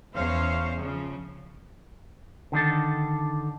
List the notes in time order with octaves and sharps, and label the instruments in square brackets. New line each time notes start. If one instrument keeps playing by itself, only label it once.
[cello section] E2 E3 C#4 C5 C#5 F5
C#3 F3
[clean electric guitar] D3 D#3 D4 A4